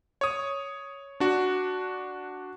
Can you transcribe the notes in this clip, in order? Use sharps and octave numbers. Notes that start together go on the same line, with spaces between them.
C#5 D#6
D4 F#4